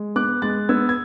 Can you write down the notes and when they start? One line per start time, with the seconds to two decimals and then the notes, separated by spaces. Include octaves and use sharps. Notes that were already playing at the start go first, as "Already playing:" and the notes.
Already playing: G#3
0.16 B3 D6 F#6
0.42 G#3 F#6 A6
0.69 B3 E6 G#6
0.89 G#6